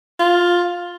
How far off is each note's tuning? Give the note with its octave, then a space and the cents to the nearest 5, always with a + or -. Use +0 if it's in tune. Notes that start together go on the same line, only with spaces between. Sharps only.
F4 +10